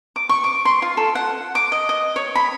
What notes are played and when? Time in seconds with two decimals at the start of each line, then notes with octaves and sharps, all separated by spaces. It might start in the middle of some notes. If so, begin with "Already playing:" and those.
0.16 D6
0.29 C#6
0.44 D6
0.65 C6
0.82 F4
0.97 A4
1.15 F#5
1.55 D6
1.72 D#5
1.89 D#5
2.16 C#5
2.35 B5